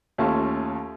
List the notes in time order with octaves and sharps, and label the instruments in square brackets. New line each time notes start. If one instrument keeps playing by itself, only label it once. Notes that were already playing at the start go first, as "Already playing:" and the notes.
[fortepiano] D#2 A3 C#4 F4 A5